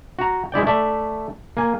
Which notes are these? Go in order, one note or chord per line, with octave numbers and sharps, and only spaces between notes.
F#4 A#5
G#3 E4 D5 G5
A3 D5 E5
A#3 G#5